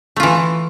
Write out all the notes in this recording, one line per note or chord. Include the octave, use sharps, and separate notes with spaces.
E3 A3 F4